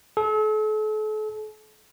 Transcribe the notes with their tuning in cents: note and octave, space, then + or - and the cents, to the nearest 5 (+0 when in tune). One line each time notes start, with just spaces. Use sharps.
A4 -40